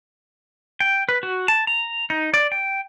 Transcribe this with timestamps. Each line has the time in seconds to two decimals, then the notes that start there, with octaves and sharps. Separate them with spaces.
0.80 G5
1.09 B4
1.23 F#4
1.48 A5
1.67 A#5
2.10 D#4
2.34 D5
2.52 G5